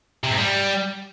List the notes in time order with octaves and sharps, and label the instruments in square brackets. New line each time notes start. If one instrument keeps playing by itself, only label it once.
[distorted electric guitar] C3
G#2
G3